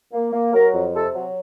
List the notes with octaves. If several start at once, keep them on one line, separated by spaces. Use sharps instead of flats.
A#3
A#3
F#3 A#4
F2
C3 A4
F#3